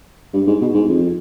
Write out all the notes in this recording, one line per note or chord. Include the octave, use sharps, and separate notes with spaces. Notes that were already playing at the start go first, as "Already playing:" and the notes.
G2
G#2
B2
G#2
F2